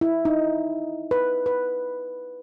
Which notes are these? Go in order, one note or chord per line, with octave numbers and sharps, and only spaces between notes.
E4
D#4
B4
B4